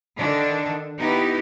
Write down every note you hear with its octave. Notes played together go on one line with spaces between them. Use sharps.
D3 D#3 D4
B3 D#4 E4 G4